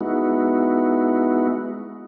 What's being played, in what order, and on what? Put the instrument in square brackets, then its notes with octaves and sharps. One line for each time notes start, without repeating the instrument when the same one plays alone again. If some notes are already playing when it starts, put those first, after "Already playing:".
[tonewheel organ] G#3 B3 D#4 E4 F#4